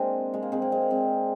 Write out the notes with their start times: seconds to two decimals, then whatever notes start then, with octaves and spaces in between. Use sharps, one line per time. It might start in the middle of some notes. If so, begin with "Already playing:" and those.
Already playing: G#3 A#3 C4 D4
0.34 G#3
0.43 A#3
0.52 G#3 C4
0.62 A#3
0.72 G#3
0.81 A#3
0.91 G#3 C4